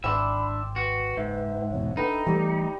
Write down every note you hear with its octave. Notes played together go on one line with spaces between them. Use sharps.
G#1 D4 E5 G5 B5 C6 D6
F#4 B4
F#1 G#2 E5
F1 E2 B2 C#5
D4 D#4 A4 B4 G5
E3 G3 A3 G4 D5